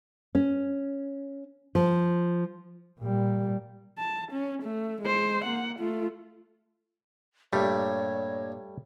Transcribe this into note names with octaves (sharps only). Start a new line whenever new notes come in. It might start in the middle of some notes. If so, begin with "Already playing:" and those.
C#4
F3
A#2 G3
A5
C#4
A3
G#3 C5
A#3 F#5
A3 F4
G2 A#2 G3 A3 C#5